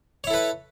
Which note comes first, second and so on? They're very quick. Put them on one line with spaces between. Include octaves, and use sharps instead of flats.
C#5 E4 A4 B4